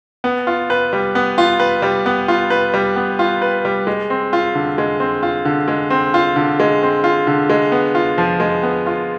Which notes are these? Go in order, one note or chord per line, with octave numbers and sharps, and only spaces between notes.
B3
F4
B4
G3
B3
F4
B4
G3
B3
F4
B4
G3
B3
F4
B4
G3
G#3
C4
F4
D3
G#3
C4
F4
D3
G#3
C4
F4
D3
G#3
C4
F4
D3
G#3
B3
F4
F3
G#3
B3
F4